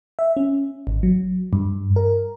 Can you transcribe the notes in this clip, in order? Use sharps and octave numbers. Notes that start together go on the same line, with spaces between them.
E5
C#4
G#1
F#3
G2
A#4